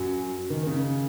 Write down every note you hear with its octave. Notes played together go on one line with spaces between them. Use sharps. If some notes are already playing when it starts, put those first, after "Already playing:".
Already playing: F#2 F#3
D#3
C#3